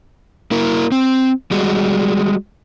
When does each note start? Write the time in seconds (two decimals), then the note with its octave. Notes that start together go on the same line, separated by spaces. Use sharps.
0.51 A#3 E4 A#4
0.92 C4
1.51 G3 G#3 F#4